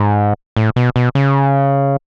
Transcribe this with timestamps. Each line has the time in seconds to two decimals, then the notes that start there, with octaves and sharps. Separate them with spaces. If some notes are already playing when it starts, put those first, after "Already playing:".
Already playing: G#2
0.56 A2
0.76 B2
0.96 B2
1.15 C#3